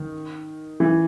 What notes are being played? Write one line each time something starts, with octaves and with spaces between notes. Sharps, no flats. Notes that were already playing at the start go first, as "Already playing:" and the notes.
Already playing: D#3
E3